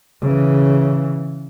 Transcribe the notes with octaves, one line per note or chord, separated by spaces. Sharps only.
C#3 E3